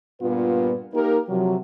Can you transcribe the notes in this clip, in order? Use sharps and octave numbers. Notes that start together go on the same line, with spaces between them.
G2 A#2 B3 F4 B4
A#3 D#4 G4 A#4
C3 F3 F#3